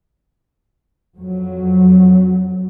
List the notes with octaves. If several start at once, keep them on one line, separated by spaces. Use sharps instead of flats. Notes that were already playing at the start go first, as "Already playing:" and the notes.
F2 F#3